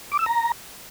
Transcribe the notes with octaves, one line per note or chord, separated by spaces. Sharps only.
D6
E6
A#5